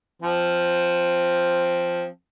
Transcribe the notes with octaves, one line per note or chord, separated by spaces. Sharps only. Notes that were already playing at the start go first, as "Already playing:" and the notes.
F3 C4